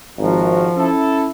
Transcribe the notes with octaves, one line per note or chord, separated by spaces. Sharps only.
G#1 F3 F#4 A#4
C#4 E4 A4